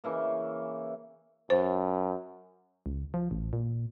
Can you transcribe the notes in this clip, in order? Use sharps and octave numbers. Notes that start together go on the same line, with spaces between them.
C#3 E3 A#3
F#2 C5
C#2
F3
A1
A#2